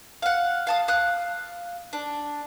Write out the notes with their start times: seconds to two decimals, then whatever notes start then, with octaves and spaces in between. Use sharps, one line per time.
0.22 F5 F#5
0.67 F5 A5 D#6
0.88 F5 D#6 F#6
1.93 D4